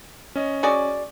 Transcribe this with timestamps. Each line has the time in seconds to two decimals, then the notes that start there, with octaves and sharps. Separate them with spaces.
0.36 C#4 D#5
0.63 F#4 G#4 D5